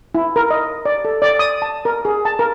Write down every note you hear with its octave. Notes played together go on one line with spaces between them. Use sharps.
E4
A#4
D#5
D5
A4
D5
D#6
A5
A#4
G#4
A5
A#4